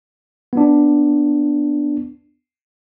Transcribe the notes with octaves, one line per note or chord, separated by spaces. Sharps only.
B3 D4